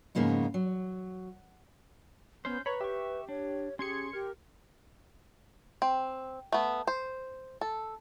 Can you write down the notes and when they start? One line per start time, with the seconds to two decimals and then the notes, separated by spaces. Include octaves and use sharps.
0.15 F2 G#2 C#3 A#3 B3 D#4
0.54 F#3
2.45 B3 C#4 C5 G6
2.66 B4 C#5 A#5 B5
2.81 G4 E5 C#6
3.29 D4 C#5
3.79 C#4 G4 G#4 C6 G#6 C#7
4.13 G4 A#4
5.82 C4
6.52 A3 B3
6.87 C5
7.61 A4